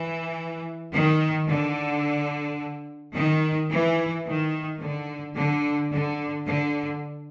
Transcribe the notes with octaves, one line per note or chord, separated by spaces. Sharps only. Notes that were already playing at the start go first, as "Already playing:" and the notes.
Already playing: E3
D#3
D3
D#3
E3
D#3
D3
D3
D3
D3